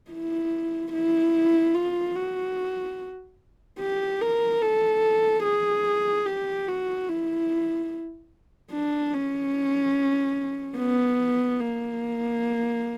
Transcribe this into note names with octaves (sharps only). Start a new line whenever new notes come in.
E4
E4
F4
F#4
G4
A#4
A4
G#4
G4
F#4
E4
D4
C#4
B3
A#3